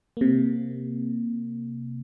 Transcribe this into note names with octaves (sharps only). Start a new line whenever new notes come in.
C3 A#3